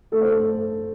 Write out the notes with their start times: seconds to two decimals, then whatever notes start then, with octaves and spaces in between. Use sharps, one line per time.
0.12 A3 A4
0.21 C5
0.30 A4